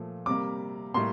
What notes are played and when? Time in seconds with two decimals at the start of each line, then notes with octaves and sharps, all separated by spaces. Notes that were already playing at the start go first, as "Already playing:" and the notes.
Already playing: A#2 F3 A3
0.26 C3 G3 A#3 D6
0.94 A2 G3 A#3 C6